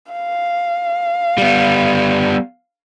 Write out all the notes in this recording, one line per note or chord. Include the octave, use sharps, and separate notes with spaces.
F5
G3 B3